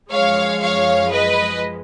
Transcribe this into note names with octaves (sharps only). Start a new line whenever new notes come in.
F#2 F3 G#3 C#5 F5
C#5 F5
B4 D#5